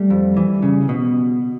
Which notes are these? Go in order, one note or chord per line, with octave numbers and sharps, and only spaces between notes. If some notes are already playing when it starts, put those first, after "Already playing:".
Already playing: G3 A3
F2
E3
C#3
B2